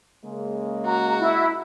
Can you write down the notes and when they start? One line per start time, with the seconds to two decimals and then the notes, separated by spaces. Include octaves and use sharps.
0.25 C#3 G#3 A#3
0.86 F#4 A#5
1.20 E4